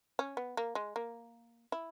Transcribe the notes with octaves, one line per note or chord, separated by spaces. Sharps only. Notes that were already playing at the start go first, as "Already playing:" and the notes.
C#4
B3
A#3
G#3
A#3
E4